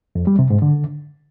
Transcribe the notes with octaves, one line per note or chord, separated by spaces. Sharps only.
F2
G3
C3
G#2
D3